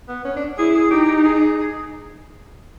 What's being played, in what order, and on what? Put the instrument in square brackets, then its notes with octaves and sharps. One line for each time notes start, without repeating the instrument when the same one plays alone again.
[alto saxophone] B3
C#4
D4
[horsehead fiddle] E4 [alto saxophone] G#4
[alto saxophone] G#4
[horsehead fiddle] D#4 [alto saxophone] G4
[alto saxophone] G#4